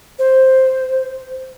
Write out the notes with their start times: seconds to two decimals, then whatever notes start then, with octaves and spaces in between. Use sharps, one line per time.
0.19 C5